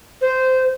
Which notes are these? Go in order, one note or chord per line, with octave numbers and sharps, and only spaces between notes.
C5